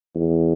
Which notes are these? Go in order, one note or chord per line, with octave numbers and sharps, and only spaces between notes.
E2